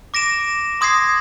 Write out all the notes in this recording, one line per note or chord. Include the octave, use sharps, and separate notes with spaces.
D6 A#6 D7 E7
C6 D#6 G#6 A#6 C7